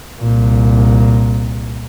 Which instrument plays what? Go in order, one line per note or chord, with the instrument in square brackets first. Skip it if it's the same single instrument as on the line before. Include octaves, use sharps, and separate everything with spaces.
[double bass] C2 A#2